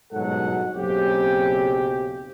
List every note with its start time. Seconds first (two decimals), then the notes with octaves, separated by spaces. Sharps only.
0.12 G1 G#2 B2 F#3 A4 F#5
0.75 F#1 B1 C#3 C4 G4